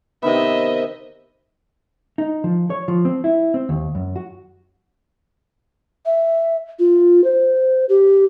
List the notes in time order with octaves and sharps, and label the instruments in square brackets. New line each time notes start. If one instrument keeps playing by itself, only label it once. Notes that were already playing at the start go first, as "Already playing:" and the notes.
[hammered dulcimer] C3 D#3 B3 [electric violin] D#5 E5
[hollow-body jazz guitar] D#4
F3
C#5
F3
C4
E4
C4
D#2
F#2
F#4
[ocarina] E5
F4
C5
G4